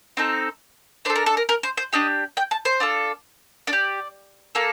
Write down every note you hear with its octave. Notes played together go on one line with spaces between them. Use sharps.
C4 D#4 A4
D4 A4 C5
A#4
A4
A#4
A#4
C5
C5
D4 G4 D#5
G5
A5
C5
D4 F4 A4
D4 D5
G4
A#3 F4 A4